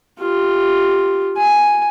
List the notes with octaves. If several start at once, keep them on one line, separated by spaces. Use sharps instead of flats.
F4 G4
G#5